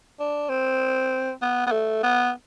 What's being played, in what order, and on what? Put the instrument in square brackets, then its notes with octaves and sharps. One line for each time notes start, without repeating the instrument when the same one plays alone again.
[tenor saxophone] D4
C4
B3
B3
A3
B3